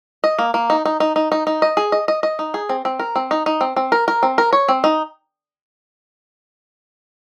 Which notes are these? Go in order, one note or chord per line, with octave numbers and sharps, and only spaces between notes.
D#5
A#3
A#3
D#4
D#4
D#4
D#4
D#4
D#4
D#5
G#4
D#5
D#5
D#5
D#4
G#4
C4
C4
A#4
C4
D#4
D#4
C4
C4
A#4
A#4
C4
A#4
C#5
C4
D#4